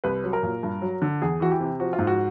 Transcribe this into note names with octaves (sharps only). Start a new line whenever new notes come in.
C2 B4
F#3
A#4
A#2
G2
F#3
D3
E2 G#4
E3 F#4
G4
C3
F3 F#4
F4
G#2
F#4